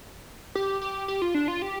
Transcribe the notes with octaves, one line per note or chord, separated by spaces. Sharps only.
G4
G4
G4
F4
D4
F4
G4